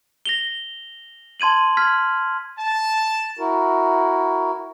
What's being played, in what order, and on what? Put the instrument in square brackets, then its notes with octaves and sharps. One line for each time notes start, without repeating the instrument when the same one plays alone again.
[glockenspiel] A#6 F7 G7
A5 C6 G#6 D#7 F#7
F6 G#6 B6 F#7
[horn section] A5
[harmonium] E4 F#4 A#4